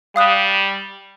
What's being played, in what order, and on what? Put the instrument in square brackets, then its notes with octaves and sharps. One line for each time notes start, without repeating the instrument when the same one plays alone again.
[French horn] G3 [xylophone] F5 D#6 F#6